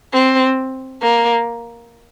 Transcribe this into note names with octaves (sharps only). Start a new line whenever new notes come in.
C4
A#3